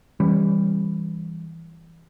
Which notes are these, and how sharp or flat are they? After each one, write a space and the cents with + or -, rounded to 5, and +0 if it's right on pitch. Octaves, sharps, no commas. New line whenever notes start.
E3 +0 G3 +15 C#4 -10